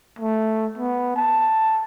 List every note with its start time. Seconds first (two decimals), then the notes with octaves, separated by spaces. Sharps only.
0.19 A3
0.78 B3
1.16 A5